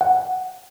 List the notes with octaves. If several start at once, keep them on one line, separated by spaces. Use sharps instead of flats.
F#5